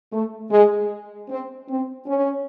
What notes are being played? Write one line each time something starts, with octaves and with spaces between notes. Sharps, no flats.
A3
G#3
C4
C4
C#4